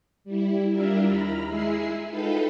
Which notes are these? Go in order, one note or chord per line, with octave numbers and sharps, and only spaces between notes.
G3 E4
G3 D4 E4 F4 A#4 E5
D#2 A#5 B5 F6
G#3 E4 G#4 E5 C7
D#4 F4 A4 B4 G5 B5